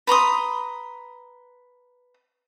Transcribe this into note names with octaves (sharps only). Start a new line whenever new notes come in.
B4 A#5 C6 D#6